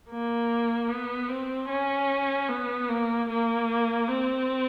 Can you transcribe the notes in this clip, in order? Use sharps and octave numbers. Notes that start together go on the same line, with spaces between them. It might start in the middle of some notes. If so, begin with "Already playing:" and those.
A#3
B3
C4
C#4
B3
A#3
A#3
C4